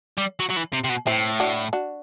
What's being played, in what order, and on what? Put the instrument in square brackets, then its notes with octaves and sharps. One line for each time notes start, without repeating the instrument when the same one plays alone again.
[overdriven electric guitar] G3
F#3
F#3
E3
C3
C3
B2
[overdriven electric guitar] A2 [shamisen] C4 E4
[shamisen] D4 F#4
D4 F#4